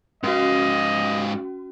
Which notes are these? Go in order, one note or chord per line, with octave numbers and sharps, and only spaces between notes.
G#2 C#4 F#4 D#5 F5